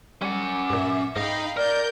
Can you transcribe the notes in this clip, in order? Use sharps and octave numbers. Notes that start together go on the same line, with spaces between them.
G3 C#4 F#5 D6
G2 A#2 E5
G#2 D#4 D#5 F5 G5 B5
A#4 D5 G6